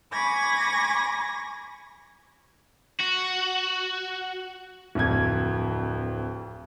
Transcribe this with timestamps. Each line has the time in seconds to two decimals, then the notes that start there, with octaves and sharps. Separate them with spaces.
0.11 G#5 B5 C#6 D6 G#6 A#6
3.00 F#4
4.95 D1 F2 G#6